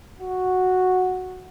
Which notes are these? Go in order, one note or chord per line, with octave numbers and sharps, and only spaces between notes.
F#4